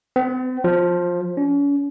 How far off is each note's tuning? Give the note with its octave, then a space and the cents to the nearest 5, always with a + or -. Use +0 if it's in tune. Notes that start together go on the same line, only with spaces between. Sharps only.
C4 -45
F3 +15
C#4 +40